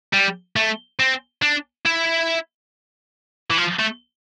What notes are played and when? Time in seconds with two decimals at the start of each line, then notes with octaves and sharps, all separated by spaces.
0.13 G3
0.56 A3
0.99 C4
1.42 D4
1.85 E4
3.51 E3
3.58 F3
3.79 A3